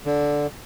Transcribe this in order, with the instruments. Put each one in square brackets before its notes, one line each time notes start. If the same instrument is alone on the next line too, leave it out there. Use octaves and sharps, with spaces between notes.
[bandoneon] D3